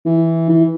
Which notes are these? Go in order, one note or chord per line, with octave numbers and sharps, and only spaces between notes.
E3
E3